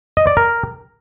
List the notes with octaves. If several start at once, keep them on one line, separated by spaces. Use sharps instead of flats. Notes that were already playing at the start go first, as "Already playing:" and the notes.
D#5
D5
A#4